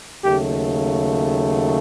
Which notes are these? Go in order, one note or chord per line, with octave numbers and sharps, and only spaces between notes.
D#2 C#3 F#3 A3 G4